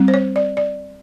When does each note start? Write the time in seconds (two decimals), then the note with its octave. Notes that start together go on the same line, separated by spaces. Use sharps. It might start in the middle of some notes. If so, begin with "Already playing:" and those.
Already playing: G3 C4
0.08 C5
0.14 C#5
0.36 D5
0.57 D5